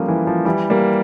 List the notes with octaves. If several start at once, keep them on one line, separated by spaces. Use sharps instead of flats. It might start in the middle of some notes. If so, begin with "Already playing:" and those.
Already playing: F3 G3 A3 A#3 C#4
E3
F3
E3 G3
G3 A#3